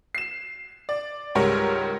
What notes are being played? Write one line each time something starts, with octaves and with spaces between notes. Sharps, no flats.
C7 E7
D5
C#2 G#2 G3 A#4 C#5